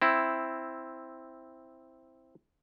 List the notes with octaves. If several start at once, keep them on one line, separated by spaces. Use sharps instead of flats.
C4 E4